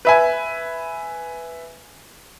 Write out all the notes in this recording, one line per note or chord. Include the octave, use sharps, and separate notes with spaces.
B4 E5 G#5